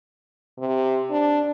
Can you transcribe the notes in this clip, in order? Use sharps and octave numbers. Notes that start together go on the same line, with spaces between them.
C3
D4